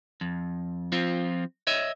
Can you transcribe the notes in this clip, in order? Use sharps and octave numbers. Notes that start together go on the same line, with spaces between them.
F2
F3 C4 F4
C#5 D#5 E5